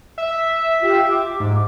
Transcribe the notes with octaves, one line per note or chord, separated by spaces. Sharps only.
E5
F4 G4
D6
G#2